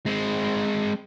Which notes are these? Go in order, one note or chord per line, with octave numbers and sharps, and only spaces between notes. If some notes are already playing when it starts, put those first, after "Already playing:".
G#3 C4